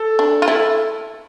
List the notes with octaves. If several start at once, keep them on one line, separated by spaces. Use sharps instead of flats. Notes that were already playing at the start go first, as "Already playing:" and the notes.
Already playing: A4
D4
F4
E4 A4